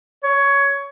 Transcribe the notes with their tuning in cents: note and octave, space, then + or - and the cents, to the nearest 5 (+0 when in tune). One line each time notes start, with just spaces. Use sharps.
C#5 +15